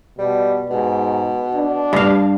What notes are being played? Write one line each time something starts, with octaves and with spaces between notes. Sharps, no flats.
B2 G3
G#2 B2
D4
G2 F5